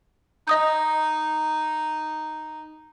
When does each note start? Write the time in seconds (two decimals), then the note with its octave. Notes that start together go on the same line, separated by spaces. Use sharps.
0.48 D#4 D#5 D#6 G6